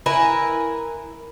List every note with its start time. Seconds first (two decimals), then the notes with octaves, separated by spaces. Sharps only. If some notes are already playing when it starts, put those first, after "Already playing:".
0.06 E4 A#4 B4 G#5